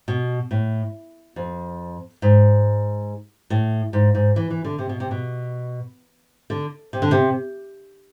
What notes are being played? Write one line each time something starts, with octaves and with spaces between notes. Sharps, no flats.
B2
A2
F2
G#2
A2
G#2
G#2
E3
E3
D3
C3
B2
C3
B2
D3
C3
D3
C3